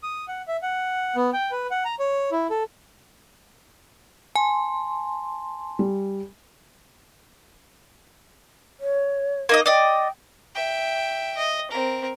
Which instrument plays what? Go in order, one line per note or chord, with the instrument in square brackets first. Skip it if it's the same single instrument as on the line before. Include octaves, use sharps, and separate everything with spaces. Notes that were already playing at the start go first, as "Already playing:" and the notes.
[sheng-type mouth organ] D#6
F#5
E5
F#5
B3
G5
B4
F#5
A#5
C#5
E4
A4
[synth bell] G#5 [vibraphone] A5 C6
[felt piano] G3
[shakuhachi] C#5
[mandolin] A#3 D#4 D#5
[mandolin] D5 D#5 [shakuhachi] G5
[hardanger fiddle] E5 G5
D#5
C4 A#4